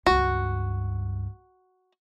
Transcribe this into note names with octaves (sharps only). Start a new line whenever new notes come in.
C#2 G2 F#4